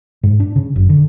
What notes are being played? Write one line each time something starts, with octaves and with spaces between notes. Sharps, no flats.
G#2
D4
C#3
F#1
D3